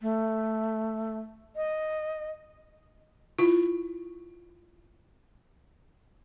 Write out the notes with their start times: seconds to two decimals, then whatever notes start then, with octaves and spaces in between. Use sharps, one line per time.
0.01 A3
1.56 D#5
3.39 E4 F4